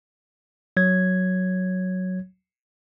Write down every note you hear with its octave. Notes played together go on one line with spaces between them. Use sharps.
F#3 C#5 G#6